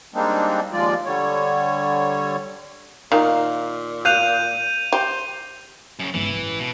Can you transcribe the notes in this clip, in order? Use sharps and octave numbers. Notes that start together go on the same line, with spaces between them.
G3 G#3 A#3 C4 D4 D#4
D#2 F3 G#3 F4 D5
D3 G3 C#5
A#2 D#3 F5
F5 F#6 G6 D#7 F7
G4 C5
F#2 C#3
G1 C#2 E3
A1
B2